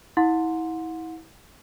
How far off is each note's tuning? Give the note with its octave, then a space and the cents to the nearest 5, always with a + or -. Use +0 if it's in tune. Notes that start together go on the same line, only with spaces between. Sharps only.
E4 -30 F#5 -35 C6 +0